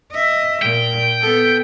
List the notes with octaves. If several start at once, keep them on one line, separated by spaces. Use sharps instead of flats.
D#5 E5
A#2 G5
B3 A4